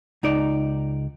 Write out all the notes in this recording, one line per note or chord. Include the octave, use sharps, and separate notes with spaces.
C#2 D#4 D5